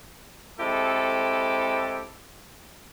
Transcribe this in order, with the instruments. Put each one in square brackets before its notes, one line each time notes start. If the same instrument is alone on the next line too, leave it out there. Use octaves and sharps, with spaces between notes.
[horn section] G#3 C4 E4 G4 A4